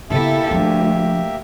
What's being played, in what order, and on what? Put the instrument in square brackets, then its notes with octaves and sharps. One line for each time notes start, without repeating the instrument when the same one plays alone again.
[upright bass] C#3 B3 [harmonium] A#3 G4 E5 [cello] E4 A4
[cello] D2 [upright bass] F3 D4